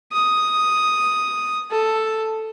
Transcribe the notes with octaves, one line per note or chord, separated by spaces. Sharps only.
D#6
A4